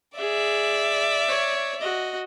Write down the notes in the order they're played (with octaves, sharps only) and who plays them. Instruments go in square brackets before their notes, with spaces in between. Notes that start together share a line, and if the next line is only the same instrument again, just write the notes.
[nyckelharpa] G#4 [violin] D5 E5
[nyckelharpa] C#5
F#4 D#5